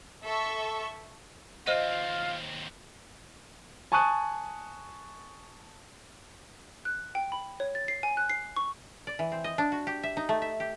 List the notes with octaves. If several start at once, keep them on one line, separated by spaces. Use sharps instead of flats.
A4 E5 C#6
D#2 C4 F4 C5 D#5 F5 D#7
G#5 A5 C#6 D#6 F#6 D#7
F#6
G5
B5
C#5
A6
C7
G#5
F#6
C7
C#6
D5
E3
C4
D#5
D4
F#4
G4
E5
D#4
A3
E5
G4